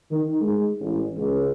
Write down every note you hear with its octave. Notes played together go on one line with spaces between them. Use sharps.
D#3
G#3
A1
C#2